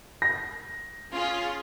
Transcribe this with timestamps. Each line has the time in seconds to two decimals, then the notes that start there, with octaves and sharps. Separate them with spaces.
0.22 A#6
1.13 C#4 F4 G#4